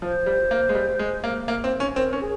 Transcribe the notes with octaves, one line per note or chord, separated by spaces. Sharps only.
F3 C5
G3
A#3
G#3
G3
G#3
A#3
A#3
C4
C#4
C4 A#4
C#4
G#4